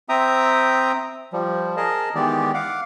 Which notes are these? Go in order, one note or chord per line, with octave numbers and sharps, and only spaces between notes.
C4 E5 G5 A#5 D#6
F3 G3
G#4 A#4 D#5 A5
D#3 E3 G#3 B3 G4 D5
F5 F#5 D6